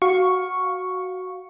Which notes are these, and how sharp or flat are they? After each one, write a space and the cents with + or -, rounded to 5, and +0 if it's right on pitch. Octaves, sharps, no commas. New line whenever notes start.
F#4 +0 F5 +15 C#6 +0